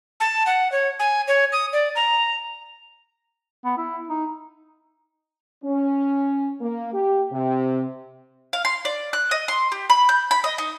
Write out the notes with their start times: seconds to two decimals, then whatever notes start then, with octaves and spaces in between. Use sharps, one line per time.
0.20 A5
0.46 F#5
0.72 C#5
1.00 G#5
1.28 C#5
1.53 D#6
1.73 D5
1.95 A#5
3.64 B3
3.78 E4
4.09 D#4
5.65 C#4
6.61 A#3
6.93 G4
7.32 C3
8.53 F5
8.65 C6
8.85 D5
9.13 F#6
9.31 D#5
9.48 C6
9.72 G4
9.90 B5
10.09 G6
10.31 B5
10.44 D#5
10.58 D#4